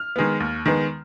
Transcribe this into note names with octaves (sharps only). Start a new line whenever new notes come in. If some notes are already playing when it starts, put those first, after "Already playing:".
Already playing: F6
D#3 G#3 B3
D#2
D#3 G#3 B3